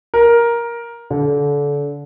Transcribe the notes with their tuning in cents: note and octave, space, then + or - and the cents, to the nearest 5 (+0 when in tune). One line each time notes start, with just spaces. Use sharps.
A#4 +10
D3 -30